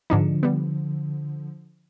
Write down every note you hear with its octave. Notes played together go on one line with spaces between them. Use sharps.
G#2 D3 F3 D4 D#4
G3 B3